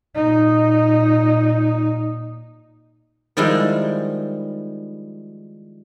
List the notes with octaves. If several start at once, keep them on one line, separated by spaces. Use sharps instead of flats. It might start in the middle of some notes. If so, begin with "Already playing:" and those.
A#2 D#4
D#3 F3 G3 G#3 E4